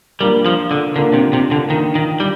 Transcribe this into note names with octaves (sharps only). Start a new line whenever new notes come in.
G3 A#3 D4 F4 A#4
F3
D3
D3 A#3 D4 F4 A#4
C3
C3
D3
D#3 A#3 D4 F4 A#4
D#3
G3